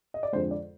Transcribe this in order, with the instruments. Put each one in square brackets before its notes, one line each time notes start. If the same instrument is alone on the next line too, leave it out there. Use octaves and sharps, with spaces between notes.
[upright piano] D#5
D5
F2 D3 G#3 C5
D5